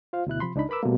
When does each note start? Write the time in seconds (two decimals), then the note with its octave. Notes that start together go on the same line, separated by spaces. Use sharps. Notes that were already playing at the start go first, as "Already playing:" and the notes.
0.13 F4 C5 F5
0.27 D2 B2 E4 F#6
0.40 C3 F3 B5 C6
0.55 C#2 D4 D#4 B5
0.69 A#4 B4 B5 D6 E6
0.83 B2 G3 A3 A#3